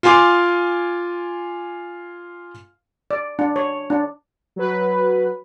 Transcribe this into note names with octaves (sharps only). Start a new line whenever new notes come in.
F4 F5 G#5 C6 D6
D5
D4
C#5
D4
F#3 B4